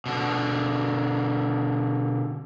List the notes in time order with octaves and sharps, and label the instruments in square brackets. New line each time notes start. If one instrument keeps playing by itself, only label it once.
[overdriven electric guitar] B2 D3